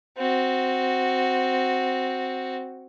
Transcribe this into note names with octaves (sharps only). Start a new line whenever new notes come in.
C4 F#4